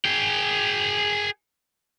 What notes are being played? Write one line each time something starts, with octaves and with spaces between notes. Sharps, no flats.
G#4 G5